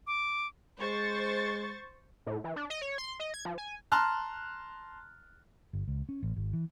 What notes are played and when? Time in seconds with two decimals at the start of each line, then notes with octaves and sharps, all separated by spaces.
0.07 D6
0.80 G#3 C5 C#6 A6
2.26 A2
2.44 E3
2.56 D4
2.70 D#5
2.82 C#5
2.98 C6
3.20 D#5
3.34 G#6
3.45 F3
3.58 G#5
3.92 A5 A#5 C6 F6 F#6
5.73 G1
5.88 C#2
6.09 C#4
6.23 A1
6.36 G#1
6.53 E3